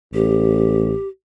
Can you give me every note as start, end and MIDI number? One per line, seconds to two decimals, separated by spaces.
0.14 0.92 33
0.14 1.07 67